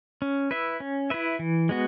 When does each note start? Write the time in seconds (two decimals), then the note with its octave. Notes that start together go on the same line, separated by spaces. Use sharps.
0.22 C#4
0.51 E4 B4 E5
0.80 C#4
1.10 E4 B4 E5
1.39 E3
1.69 G#3 B3 F#4